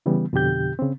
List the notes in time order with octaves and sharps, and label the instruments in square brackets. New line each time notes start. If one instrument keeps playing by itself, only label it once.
[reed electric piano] C#3 E3 G3 B3
F2 B2 D3 G4 G6
C#3 C4